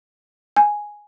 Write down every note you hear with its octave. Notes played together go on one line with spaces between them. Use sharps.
G#5